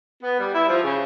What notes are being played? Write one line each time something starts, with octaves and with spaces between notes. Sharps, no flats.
B3
G3
E4
F3
C#3